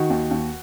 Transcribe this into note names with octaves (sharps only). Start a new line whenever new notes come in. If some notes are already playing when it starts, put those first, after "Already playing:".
Already playing: D#3 F#4
D#2
D#2